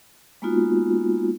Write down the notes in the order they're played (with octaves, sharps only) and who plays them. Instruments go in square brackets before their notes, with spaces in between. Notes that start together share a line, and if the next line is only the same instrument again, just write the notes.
[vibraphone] G#3 A#3 B3 D#4 F4 F#4